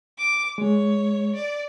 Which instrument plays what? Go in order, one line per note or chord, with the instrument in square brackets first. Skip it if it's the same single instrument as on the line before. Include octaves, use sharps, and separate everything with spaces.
[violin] D6
[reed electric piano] G#3 [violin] C#5
[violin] D5